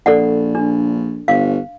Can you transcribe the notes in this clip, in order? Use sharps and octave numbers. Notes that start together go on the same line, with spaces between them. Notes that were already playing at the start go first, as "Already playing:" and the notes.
A#1 A4 D5 F#5
D4
G1 F5